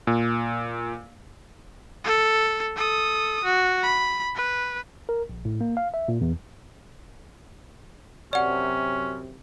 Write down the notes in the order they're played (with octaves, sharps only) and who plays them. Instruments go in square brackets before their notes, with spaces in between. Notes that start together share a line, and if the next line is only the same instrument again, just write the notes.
[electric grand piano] A#2
[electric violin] A4
A4 D#6
F#4
B5
B4
[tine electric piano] A#4
A#1
A2
A#3
F5
E5
A#2
E2
[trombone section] F#2 C3 [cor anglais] C#4 [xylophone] D5 F#5